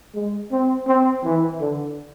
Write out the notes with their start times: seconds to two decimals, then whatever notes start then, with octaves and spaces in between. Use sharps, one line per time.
0.15 G#3
0.52 C4
0.87 C4
1.24 E3
1.60 D3